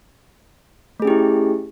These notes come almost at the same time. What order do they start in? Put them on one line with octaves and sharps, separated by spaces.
A3 G#4 C#4 G4 E4